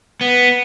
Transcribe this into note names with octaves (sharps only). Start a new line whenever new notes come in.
B3